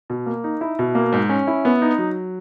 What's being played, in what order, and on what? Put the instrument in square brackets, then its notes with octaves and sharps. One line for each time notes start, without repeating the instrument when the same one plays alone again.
[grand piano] B2
A#3
D#4
E4
B2
A#3
G#2
C#4
E4
B3
D#4
F#3